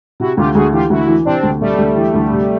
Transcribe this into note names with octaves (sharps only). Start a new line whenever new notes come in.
C3 E4 F#4
D2 F4 G4
D2 F#4 G#4
E3 F4 G4
D2 E4 F#4
E3
C3 C4 D4
D2
C3 G3 A3
D2
E3
D2
C3